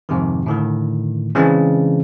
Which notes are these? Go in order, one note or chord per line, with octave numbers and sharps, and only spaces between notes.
F2 G#2 C3 D#3
A2 D3 D#3
C#3 E3 G#3 C4 D4